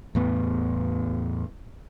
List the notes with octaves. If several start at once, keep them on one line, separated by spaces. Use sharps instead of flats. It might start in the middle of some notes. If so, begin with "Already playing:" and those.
E2 A2 B3